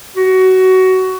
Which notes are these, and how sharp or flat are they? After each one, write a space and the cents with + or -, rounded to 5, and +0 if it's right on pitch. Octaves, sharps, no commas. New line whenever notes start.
F#4 +20